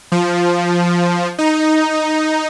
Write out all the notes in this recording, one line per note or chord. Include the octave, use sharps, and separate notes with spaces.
F3
D#4